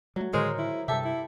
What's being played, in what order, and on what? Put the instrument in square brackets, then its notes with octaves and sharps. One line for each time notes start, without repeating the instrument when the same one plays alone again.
[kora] F#3 [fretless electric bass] G3 A3
[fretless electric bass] A2 D3 D#3 [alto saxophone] G#3 [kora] A#4 C5 C#5
[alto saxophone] E4
[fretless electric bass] G2 C3 [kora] G4 A4 [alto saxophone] E5
[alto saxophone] E4